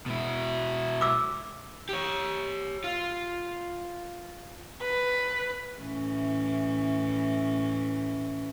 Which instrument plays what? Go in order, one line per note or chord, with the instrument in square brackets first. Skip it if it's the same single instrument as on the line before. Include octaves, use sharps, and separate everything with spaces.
[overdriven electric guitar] B2 E4
[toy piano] D6 E6
[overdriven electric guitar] G4 C#5
F4
[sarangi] B4
[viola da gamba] A2 E3 C#4